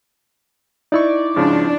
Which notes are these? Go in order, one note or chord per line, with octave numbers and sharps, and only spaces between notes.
D#4 E4 D5 C#6
G#2 C#3 F3 D4